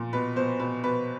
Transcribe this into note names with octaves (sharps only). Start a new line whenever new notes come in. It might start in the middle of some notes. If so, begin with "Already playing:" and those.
Already playing: A#2
B2 B4
B2 C5
B2 B4
B2 B4